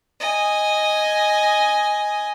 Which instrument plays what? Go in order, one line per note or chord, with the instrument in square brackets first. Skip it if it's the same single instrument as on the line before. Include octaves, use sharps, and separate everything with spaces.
[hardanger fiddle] D#5 G#5